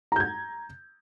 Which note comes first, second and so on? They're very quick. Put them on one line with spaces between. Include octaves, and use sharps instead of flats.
A#5 G6 G#6